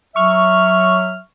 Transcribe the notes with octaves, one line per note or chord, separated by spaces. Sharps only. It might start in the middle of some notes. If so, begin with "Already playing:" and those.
F#3 E5 C#6 F6